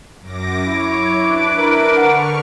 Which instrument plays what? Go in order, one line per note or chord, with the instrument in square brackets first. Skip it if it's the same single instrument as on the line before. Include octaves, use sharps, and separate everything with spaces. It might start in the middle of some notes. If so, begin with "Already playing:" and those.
[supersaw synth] F#2 D6 A#6
[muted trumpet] E4 [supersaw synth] C#5 [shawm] D6
[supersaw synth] D4 B4
[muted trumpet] E4 [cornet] A#4
[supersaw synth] D3 C#6 F6 [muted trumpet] F#5